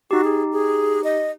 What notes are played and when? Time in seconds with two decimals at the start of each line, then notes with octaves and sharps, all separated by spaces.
0.11 D#4 F#4 G4
0.24 G#4
0.52 G#4
1.04 D#5